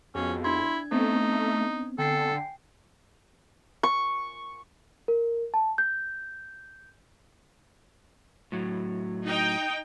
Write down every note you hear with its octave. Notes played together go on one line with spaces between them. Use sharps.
F2 B3 C#4 F#4 G#4
D4 E4 C6 G#6
A3 B3 C4 D#4
D3 A4 G5 G#5 C7
C#6
A#4
A5
G6
A2 F#3
D#4 G5